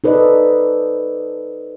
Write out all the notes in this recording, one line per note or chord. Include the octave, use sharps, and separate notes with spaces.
D#4 A4 B4 C5 D5 D#5